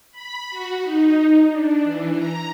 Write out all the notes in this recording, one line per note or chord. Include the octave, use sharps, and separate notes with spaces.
B5
F#4
D#4
D4
E3
A#5